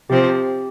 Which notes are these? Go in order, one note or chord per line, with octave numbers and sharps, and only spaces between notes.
C3 F3 C4 G4